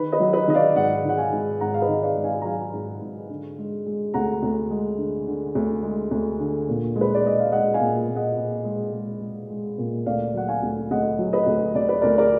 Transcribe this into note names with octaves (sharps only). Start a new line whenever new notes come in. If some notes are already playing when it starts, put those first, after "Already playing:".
Already playing: D#3 B4
B4 D#5
F#3
B4 D#5
D#3 D#5
D5 F5
G#2 D#5 F#5
D#3 F#5
F5 G#5
G#2
G#2 F#5 A#5
F5
B4 D#5
D#3
D5 F5
G#2
F5 G#5
A#5
F#3 F5 G#5
G#2
G#2
D3
G#3
G#3
D2 F#5 A#5
D2
G#3
D3
D3
D2
G#3
D2
D3
A#2
G#3
B4
D5
G#3 D#5
F5
G#3 D#5 F#5
F5 G#5
A#2
A#2
D#5 F#5
A#2
G#3
G#3
G#3
G#3
A#2
D2 D5 F5
F#3 F#5
F5 G#5
D2
D2 D#5 F#5
F#3
B4 D#5
D2
D2 D5
B4
D2 A#4 D5
A#4 D5